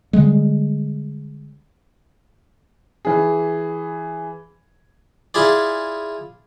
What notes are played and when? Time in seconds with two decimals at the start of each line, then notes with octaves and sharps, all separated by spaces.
0.13 D3 G3 G#3
3.05 E3 G#4
5.34 E4 F4 G#4 D5